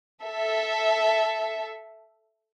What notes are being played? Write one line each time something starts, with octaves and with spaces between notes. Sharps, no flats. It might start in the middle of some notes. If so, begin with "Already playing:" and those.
A4 E5